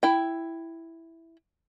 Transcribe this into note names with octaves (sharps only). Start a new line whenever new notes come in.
E4 G5